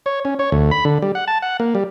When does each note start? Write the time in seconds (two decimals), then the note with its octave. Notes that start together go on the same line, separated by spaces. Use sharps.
0.06 C#5
0.25 C#4
0.39 C#5
0.52 D2
0.71 B5
0.85 D3
1.02 G3
1.15 F#5
1.28 A5
1.42 F#5
1.60 A#3
1.75 G3